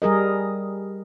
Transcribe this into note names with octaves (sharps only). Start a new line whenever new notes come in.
G3 G#4 A#4 D#5